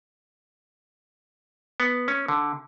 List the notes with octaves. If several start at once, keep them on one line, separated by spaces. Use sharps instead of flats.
B3
C#4
D3